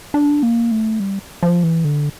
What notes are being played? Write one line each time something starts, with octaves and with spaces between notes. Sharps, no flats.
D4
A#3
A3
G3
F3
E3
D3